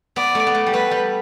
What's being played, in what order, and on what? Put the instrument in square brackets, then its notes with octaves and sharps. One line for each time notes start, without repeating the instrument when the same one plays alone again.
[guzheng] B3 [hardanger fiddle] D5
[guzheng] A3
B3
A3
G3
[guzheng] A3 [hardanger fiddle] B4
[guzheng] G3